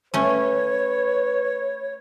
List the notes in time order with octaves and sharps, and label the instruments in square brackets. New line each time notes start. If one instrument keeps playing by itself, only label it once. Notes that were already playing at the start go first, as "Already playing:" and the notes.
[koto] A3 C#4 [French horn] B4 [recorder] C#5